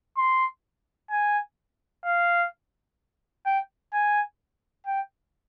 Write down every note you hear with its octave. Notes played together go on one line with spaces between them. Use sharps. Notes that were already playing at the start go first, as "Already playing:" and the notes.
C6
G#5
F5
G5
G#5
G5